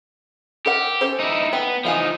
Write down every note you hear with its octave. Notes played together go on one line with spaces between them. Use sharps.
G4 A4 A#4 F#5
C#4 A4 C5
D#4 E4
B3 G5
E3 F3 D#4 F5 G#5